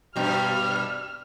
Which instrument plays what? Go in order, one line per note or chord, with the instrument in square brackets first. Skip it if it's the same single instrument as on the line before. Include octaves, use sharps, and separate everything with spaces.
[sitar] G2 B2 G3 [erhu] F6